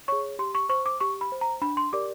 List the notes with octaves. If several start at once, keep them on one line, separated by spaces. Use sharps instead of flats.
G#4 C#5 C#6
G4 C6
C#6
C5 C#6
D6
G4 C#6
B5
C5
A#5
D4 B5
C6
G4 A#4 D5 D6